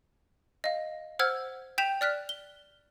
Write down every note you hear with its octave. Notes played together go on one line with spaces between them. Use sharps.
D#5 F5
C5 F#5 E6 F6 G#6
G5 G6 B6 E7 F7
D5 F6 F#6 B6
G7